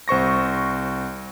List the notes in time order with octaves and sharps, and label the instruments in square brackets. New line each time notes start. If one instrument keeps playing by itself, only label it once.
[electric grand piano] C2 C5 C#6 A#6